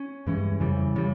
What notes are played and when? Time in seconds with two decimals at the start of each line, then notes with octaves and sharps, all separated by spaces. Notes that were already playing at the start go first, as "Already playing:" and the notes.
Already playing: C#4
0.27 G2 E3 G#3 C#4
0.60 F2 C#3 E3 G3
0.96 C#3 E3 G3